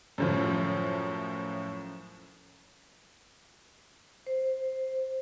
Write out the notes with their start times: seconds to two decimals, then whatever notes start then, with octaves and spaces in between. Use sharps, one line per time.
0.18 F#2 A2 F3
4.26 C5